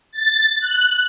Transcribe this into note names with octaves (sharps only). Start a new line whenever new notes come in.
A6
F#6